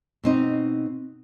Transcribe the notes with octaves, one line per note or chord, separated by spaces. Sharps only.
B2 C4 D#4